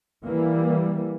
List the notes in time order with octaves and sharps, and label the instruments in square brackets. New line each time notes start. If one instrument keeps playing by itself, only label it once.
[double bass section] E3 G3 A#3